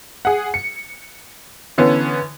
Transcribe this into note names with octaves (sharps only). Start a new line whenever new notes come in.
G#4 F#5
C#7
D3 E3 B3 C#4